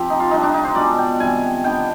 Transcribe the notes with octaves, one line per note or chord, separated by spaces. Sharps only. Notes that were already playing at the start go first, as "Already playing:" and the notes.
Already playing: F3 C4 G4
D#4
F4
C3 G3 D4 D#4
D4
D#4
C5
B2 G#3 D4 D5
G5
C3 D#3 G3 G#5
D#3 B3 D4 G5